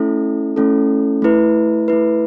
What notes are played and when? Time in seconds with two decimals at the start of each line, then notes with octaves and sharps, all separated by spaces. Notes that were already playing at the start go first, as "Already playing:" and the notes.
Already playing: A3 C#4 E4 A4
0.56 A3 C#4 E4 A4
1.22 A3 E4 B4
1.88 A3 E4 B4